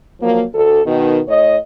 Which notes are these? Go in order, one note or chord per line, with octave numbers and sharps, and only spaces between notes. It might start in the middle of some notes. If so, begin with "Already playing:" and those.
F3 F#3 A#3
D2 A4
B2 D#3
A2 C#5 D#5